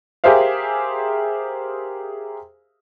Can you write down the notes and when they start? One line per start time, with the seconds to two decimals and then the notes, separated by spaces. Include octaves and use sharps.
0.24 G4 G#4 A#4 C5 E5 F5